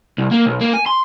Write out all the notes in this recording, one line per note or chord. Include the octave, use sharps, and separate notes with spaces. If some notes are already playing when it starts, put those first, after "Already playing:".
C2
A#3
B1
A#3
G#5
C6